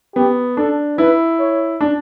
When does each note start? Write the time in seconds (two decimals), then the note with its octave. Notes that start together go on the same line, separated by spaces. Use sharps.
0.16 B3 G4
0.57 D4 A4
0.98 E4 B4
1.39 C#5
1.81 D4